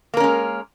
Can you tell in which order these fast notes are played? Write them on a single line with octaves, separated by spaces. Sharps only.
A#3 A#4 C#4 G#3